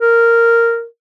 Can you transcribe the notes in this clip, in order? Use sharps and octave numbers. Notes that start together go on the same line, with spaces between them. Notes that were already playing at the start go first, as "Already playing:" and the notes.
A#4